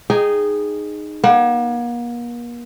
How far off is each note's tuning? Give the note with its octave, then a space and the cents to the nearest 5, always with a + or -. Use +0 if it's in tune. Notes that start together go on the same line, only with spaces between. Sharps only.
D#4 -15 G#4 +0 G5 +0
A#3 +40 F#5 +40